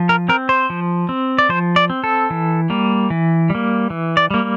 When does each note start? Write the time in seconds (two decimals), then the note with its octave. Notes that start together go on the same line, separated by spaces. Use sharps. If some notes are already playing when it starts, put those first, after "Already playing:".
Already playing: F3
0.09 A#4
0.29 C4 A#4
0.49 C5
0.70 F3
1.09 C4
1.39 D5
1.49 F3 C5
1.76 D5
1.90 C4
2.04 A4
2.30 E3
2.70 G3 A#3
3.10 E3
3.50 G3 A#3
3.90 E3
4.17 D5
4.31 G3 A#3